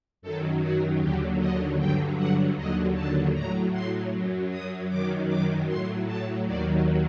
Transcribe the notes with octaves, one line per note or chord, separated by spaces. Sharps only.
F#2 D#3 F#3 A4
F#4
D#2 D3 F#3 G4
D#5
G2 D3 F#3 G5
F#5
D#2 D3 F#3 D#5
A5
A2 F#3 A#5
C6
F#2 F#3
D#6
F#2 D#3 F#3 D6
D6
A2 F#3 C6
A5
D#2 D#3 F#3 D5